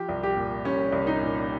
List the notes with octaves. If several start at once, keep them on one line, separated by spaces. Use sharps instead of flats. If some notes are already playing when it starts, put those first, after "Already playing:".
Already playing: F3 G4
C2
G4
A#2
C2 C#4
C2
D#4
A#2